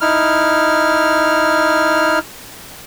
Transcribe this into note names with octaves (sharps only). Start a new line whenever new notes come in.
D#4 E4 F6